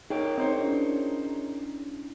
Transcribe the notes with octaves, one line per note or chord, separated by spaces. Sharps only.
D#4 G#4 A#4 C#5 G5
C4 D#4 C5 C#5
C#4 D4 E4